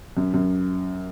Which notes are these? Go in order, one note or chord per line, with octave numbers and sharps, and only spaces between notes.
F#2
F#2